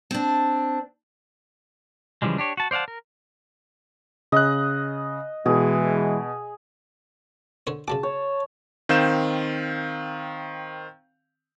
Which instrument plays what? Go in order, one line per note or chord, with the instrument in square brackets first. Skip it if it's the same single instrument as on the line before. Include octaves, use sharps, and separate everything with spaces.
[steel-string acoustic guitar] C4 D4
[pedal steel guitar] C#3 E3 F3 G3 G#3
D4 G4 C#5
F#4 A5
C5 D5 F5 F#5 A5
A#4
[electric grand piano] C#3 F#6 [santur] D#5
[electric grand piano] B2 [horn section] E3 G#3 [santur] G#4
[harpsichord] D3 C5 C#5
[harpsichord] C#3 F#3 D6 [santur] A5
[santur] C#5
[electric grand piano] D#3 C4 F5 G6 E7